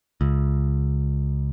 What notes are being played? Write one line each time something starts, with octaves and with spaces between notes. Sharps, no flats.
C#2